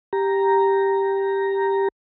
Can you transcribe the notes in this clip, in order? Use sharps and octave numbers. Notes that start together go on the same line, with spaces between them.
G4 A#5